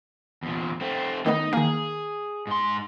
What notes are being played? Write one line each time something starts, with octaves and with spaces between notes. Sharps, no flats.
E2 A#2
A3 C4
D#3 A3 B3 D#4 D#5
D#3 A#3 G#4
G#2 C6